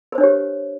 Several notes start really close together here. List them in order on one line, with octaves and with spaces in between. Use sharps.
A#4 C5 D4 C#5 G4